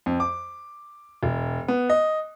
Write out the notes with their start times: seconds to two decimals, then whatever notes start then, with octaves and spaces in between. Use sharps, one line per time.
0.06 F2
0.20 D6
1.23 E1
1.68 B3
1.90 D#5